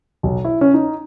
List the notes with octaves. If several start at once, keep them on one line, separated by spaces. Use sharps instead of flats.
B1
E4
C#4
D#4